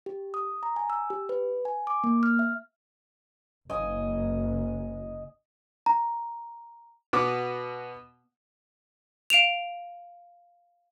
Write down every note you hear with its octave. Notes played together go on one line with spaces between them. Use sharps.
G4
D#6
A#5
G#5
E6
G4
B4
G#5
D6
A#3
F6
E5
F#1 F#3 D#5 G#5
A#5
B2 B3 F#4 D6
F5 D7 E7 F7